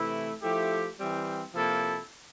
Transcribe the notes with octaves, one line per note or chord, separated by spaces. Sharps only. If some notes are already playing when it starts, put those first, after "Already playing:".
Already playing: C3 E3 A3 E4
F3 A3 E4 G4
E3 G3 C4
C3 F3 A#3 E4 A4